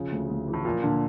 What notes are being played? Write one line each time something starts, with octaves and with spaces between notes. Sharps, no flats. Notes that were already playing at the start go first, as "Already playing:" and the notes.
Already playing: C#3 F3
D2
D2
E3
A2
A#2 F3
A#2 D3